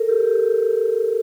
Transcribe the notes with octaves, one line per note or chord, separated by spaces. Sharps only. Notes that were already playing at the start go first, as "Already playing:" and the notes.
Already playing: A4 A#4
G4